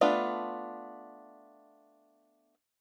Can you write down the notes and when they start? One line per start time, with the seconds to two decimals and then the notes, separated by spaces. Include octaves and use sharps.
0.01 A3 B3 D4 F4